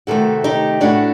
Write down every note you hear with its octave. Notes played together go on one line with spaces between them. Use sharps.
C3 D#3 A3 F#4 A4
D#4 G4
A2 A3 D4 F#4